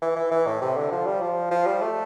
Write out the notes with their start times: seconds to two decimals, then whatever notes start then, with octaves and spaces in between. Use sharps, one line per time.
0.02 E3
0.16 E3
0.32 E3
0.47 A2
0.62 C3
0.77 D3
0.92 F3
1.06 G3
1.22 F3
1.51 F3
1.66 G3
1.81 A3